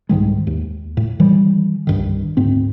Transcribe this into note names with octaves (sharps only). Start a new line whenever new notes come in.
C2 G#2 D#3 G#3
D#2
A2
D#3 E3 G3 G#3
C2 G2 D#3
D2 G#2 C4